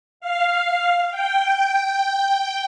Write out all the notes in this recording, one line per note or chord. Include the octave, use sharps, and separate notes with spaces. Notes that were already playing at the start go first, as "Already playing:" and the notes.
F5
G5